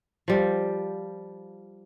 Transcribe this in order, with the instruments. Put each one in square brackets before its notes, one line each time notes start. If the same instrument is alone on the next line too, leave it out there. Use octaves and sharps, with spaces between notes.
[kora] F3 G3